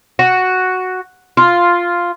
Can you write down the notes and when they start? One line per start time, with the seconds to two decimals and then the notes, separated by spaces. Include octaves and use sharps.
0.19 F#4
1.37 F4